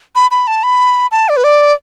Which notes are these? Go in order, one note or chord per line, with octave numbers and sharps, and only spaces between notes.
B5
B5
A5
B5
A5
D5
B4
D5